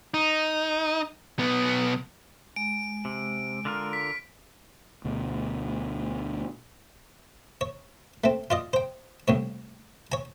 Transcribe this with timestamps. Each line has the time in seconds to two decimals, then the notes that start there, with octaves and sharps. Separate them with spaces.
0.14 D#4
1.39 B1 B3
2.56 G#3 D7
3.05 C3
3.65 D3 F4 A#4
3.93 B6
5.04 D2 B2
7.61 C#5
8.24 A3 C4
8.50 F4 D5 D#5
8.73 C5 G5
9.28 C2 A2 C#5
10.12 C#5 G#5